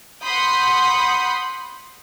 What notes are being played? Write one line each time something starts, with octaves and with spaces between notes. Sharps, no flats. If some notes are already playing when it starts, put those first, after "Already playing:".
F#5 B5 C6 D#6 G6